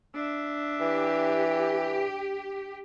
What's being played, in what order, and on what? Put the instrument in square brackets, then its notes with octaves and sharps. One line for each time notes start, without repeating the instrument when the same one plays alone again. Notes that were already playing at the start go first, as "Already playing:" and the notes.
[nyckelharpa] D4 E5
[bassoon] E3 [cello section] G4